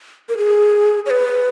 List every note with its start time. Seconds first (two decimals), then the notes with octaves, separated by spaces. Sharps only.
0.29 A#4
0.38 G#4
1.06 C#5
1.10 B4